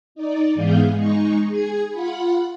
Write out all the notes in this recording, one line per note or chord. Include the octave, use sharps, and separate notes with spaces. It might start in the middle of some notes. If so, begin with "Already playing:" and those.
D#4 D5
G#2 E3 B3 G#4 F5 G6
G#3 D#4 C#6
G#4 G#6
F4 F#5 B5